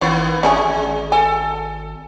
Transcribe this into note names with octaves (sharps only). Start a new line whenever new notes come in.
A1 D#3 A#3 B3 C#4
A1 G#3 C#4 D4 G#4
G#1
A4 G#5